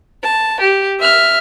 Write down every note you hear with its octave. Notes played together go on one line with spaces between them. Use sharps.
A5
G4
E5 F6